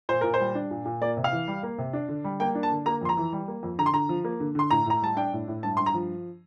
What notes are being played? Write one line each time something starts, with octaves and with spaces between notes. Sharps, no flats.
A#2 C5
A#2 A#4
C5
G3
D4
A#2
A#2
A#3 D5
C3
F5
E3
G3
A#3
C3
D4
D3
G3
A#3 G5
D4
A5
D3
A#3 A#5
F2 C6
A#5
E3
G3
A#3
F2
D3 A#5
C6
D3 A#5
F3
A#3
D3
D3 C6
A2 A#5
A2 A#5
G3 A5
D4 G5
A2
A2
G2 A5
G2 C6
A#5
F3